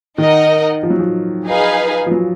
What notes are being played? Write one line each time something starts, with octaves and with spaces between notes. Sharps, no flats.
D#3 D#4 A#4 D#5 F#5
F3
F#3
F3
D#4 G#4 B4 F5 G#5
F3
F#3